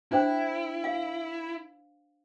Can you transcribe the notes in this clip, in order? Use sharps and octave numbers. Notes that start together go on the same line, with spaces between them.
D4 E4 C5 G5
F5